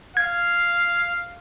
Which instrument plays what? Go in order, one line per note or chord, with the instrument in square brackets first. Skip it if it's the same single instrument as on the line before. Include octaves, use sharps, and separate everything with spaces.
[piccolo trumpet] F5 [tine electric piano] G#6